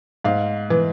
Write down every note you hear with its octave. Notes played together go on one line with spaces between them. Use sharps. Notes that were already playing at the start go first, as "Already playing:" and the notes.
G#2 F5
E3